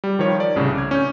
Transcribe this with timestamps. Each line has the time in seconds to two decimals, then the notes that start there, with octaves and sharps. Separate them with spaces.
0.04 G3
0.19 D#3 F3 C#5
0.40 D5
0.56 C2 A2 C#3
0.76 D6 G#6
0.91 C#4 G6